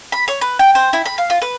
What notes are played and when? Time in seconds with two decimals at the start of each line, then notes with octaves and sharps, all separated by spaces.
0.12 B5
0.28 C#5
0.41 B4
0.59 G5
0.75 C5
0.93 E4
1.06 B5
1.18 F5
1.30 F4
1.42 B4